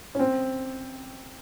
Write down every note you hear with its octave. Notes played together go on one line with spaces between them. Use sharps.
C#4
C4